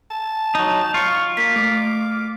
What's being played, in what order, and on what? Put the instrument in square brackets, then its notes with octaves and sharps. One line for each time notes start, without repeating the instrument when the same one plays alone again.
[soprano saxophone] A5
[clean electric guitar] F#3 D#4
[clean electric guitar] F4 [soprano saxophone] C#6 [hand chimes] C#7
[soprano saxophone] A#3 [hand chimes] B6
[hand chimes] A3 [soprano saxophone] D6